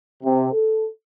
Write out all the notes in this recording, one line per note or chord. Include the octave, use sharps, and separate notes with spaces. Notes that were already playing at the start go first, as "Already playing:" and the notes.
C3
A4